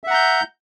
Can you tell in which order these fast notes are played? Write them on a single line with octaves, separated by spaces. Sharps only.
E5 F#5 A#5 G6